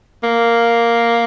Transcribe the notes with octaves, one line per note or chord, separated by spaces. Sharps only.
A#3